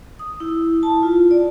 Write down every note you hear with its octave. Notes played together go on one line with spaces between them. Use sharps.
D#6
E4
A5
F4
D5